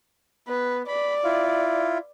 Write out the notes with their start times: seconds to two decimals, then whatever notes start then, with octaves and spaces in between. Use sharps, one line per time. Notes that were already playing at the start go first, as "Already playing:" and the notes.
0.48 B3 B4
0.88 D5 B5
1.24 E4 F4